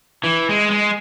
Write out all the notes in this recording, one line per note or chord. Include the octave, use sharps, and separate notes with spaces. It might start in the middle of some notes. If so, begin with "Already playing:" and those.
E3
G#3
G#3